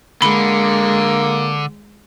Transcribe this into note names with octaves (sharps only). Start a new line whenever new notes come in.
D3 G#3 A#3 B5